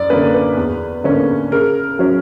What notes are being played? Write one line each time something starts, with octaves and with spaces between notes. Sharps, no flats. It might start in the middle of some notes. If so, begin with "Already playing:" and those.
Already playing: F#2 D5
D3 A#3 C#4 B4
B4
E2
D3 A#3 C#4
C#3 A#4
F#3 C#4